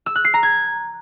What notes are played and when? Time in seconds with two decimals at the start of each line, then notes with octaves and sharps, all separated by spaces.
0.06 E6
0.15 F#6
0.25 C7
0.34 A#5
0.43 G#6